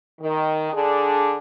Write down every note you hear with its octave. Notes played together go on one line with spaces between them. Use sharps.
D#3
D3 D4 G#4